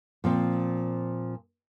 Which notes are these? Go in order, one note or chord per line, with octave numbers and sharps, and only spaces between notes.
A#2 F3 C4